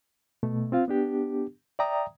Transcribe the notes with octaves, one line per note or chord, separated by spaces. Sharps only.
B2 A3
C4 F4 F5
B3 D4 G4
D5 E5 G5 A#5 D#6